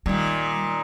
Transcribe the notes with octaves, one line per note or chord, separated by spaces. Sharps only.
A#2 D#3 G3